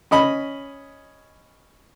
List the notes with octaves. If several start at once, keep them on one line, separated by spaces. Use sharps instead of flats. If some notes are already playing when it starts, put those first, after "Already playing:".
C#4 D#5 B5